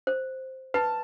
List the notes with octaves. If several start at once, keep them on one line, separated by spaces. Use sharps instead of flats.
C5
B4 A5